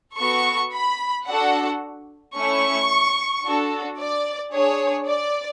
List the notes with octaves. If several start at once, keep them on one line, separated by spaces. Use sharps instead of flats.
B3 F#4 A4 C#6
B5
D4 F#4 A4 F#5
A3 C#4 E4 C#6
D4 F#4 A4
D5
D4 G#4 C#5
D5